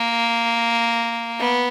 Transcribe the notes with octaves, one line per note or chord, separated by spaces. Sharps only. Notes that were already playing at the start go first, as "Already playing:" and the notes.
Already playing: A#3
B3